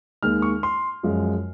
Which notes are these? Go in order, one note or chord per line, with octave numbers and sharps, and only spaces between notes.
D#2 D#3 G#3 F6
C#6
C6
F#2 F3 G#3